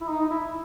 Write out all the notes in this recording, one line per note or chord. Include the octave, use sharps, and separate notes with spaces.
E4
D#4
D#4
E4